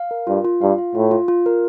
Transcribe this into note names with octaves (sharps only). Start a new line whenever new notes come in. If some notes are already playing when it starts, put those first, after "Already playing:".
Already playing: F5
A#4
G2 F4
F4
G2 F5
F4
A2 F4
F4
F4
A#4